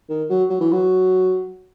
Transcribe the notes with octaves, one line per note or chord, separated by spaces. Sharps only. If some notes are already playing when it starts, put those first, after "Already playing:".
D#3
F#3
F#3
E3
F#3